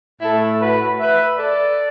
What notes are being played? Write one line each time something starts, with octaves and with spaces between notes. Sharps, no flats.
A2 A3 E4 A4
F#4 B4
B4 E5
A4 D5